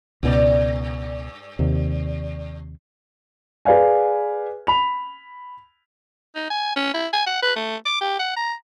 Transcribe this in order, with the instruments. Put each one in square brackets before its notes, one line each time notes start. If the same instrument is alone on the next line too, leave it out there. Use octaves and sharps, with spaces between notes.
[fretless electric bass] C#2 B2 [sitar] G2 D5
[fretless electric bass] D#2 C3
[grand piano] G#4 B4 D5 F5 G#5
B5 F7
[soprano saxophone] D#4
G#5
C#4
E4
G#5
F#5
B4
A3
D6
G4
F#5
A#5